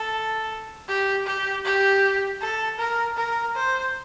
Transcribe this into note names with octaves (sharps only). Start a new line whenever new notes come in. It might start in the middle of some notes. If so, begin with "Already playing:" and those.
Already playing: A4
G4
G4
G4
A4
A#4
A#4
C5